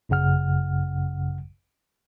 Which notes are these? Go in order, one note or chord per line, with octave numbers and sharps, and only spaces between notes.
G#1 F#2 C#3 F#5 F6